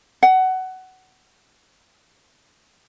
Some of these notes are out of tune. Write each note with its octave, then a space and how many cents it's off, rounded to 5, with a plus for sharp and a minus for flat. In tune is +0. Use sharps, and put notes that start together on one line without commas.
F#5 +15